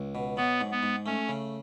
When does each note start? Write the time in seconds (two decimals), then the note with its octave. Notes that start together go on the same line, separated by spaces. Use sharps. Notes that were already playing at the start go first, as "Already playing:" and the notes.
Already playing: C#2
0.15 B2
0.37 F#3 B3
0.61 G#2
0.72 B3
0.83 G#2
1.06 A3 C#4
1.29 C#3